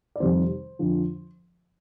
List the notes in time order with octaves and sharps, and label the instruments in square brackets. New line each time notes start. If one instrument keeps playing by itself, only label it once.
[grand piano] D5
F2 C3 D#3 G3 C5
F2 D3 F3